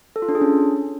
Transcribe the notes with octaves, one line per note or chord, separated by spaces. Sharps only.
A4
F4
D4
G#4
C#4